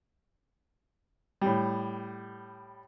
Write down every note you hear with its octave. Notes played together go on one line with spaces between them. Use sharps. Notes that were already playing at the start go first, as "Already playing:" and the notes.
A2 G3